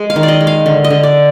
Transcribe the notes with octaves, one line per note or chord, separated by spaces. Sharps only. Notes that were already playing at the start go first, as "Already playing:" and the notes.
Already playing: G#3
F5
D#3
D5
D#5
G#3
F5
D3
D#5
D3
D5